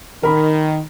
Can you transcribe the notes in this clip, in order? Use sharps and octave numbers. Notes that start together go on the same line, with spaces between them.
D#3 A#4 B5